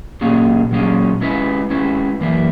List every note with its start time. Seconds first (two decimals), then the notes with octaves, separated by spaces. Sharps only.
0.21 A#2 F#3 A#3 C#4 G#4
0.71 A#2 F#3 A#3 C#4 G#4
1.21 G#3 C#4 E4 B4
1.70 G#3 C#4 E4 B4
2.20 F#2 E3 A#3 E4